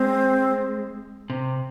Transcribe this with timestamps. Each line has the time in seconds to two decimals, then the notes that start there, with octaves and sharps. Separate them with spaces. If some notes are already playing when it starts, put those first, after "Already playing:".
Already playing: G#3 C4
1.30 C3